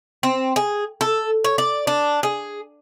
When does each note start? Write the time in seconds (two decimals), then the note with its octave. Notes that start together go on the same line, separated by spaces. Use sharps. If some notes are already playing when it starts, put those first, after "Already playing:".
0.23 C4
0.56 G#4
1.01 A4
1.44 C#5
1.58 D5
1.87 D4
2.23 G#4